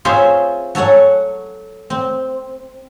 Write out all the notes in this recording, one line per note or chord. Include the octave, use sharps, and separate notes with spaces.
C4 F4 G#4 C5 C#5 E5
F#3 A4 C#5 F#5 G#5
C4